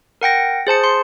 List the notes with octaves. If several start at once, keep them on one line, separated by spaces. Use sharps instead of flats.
A#4 F#5 G5 A#6
G#4 C5 A5 C#7
C6 C#7